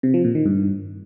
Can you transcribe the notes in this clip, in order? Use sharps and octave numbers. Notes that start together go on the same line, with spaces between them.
C3
F3
A#2
D#3
G2